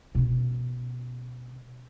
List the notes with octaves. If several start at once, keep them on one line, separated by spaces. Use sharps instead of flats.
B2 C#4